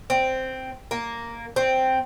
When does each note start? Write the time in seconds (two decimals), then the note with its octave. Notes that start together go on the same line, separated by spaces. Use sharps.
0.10 C4
0.91 A#3
1.56 C4